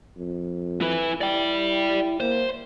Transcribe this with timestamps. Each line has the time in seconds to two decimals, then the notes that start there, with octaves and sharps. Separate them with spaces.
0.17 F2
0.81 E4 B4
1.21 E4 D5 G5
2.20 A#3 C5